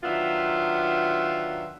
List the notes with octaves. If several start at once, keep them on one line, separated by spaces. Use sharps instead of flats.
D#3 F#3 B3 D4 F4 E5